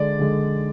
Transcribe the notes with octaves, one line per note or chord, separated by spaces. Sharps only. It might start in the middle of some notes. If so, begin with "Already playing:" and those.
Already playing: D3 G#3 D5
D3 G#3